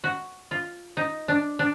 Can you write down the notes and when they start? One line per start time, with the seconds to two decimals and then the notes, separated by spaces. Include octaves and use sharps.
0.04 F#4
0.51 F4
0.97 D#4
1.28 D4
1.59 D4